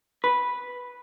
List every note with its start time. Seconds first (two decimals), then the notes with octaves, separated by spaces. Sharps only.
0.24 B4